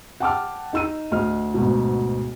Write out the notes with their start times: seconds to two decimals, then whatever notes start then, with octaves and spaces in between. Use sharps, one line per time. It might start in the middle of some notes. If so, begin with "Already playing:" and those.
0.20 F#5 G5 A5 D6 E6 F6
0.73 D#4 E6 D#7
1.12 D2 D#5 F6
1.54 D2 G#2 B2